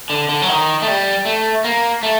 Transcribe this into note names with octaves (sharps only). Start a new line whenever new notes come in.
D3
D3
F#3
D#3
A3
G3
A3
A#3
A3